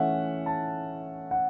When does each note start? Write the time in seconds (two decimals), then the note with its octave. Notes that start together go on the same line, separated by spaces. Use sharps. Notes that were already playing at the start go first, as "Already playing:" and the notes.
Already playing: E3 A3 C#4 E5 F#5
0.46 A5
1.31 F#5